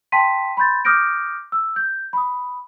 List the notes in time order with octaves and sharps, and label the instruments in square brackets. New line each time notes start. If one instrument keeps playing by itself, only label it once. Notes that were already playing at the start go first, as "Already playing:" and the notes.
[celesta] G5 A5 C6 B6 D#7
B5 C6 G6 A6
D6 D#6 F6 G6 A#6 D7
E6
G6
B5 D#6